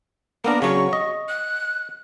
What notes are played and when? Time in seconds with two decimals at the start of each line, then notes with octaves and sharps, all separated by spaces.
0.44 A#3 B3 D4 A#4
0.62 C#3 F#3 C#6
0.93 D#5
1.29 F#6